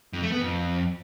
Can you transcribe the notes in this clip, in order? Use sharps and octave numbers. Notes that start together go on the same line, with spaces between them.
F2
A3
B3
F2